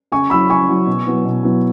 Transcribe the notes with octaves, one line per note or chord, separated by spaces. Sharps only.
C#3 G#5 C#6
F#3 E4 B5 E6
C#3 G#5 C#6
F#3 E4
B2
F#3 B3 E4
B2
F#3 B3 E4